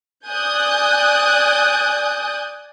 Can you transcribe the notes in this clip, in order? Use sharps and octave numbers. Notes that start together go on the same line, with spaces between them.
D5 G#5 D#6 F#6 G6